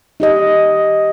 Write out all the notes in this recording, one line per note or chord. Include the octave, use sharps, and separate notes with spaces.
D#4 G4 D#5